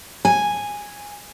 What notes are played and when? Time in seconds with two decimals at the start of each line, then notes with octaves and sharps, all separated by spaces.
0.25 G#5